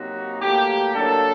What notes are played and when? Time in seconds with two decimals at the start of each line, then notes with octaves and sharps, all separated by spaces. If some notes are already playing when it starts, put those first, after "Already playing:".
Already playing: C3 F#3 A#3 D#4 F#4
0.41 A2 F#3 A#3 G4
0.94 D#3 F#3 A#3 D4 A4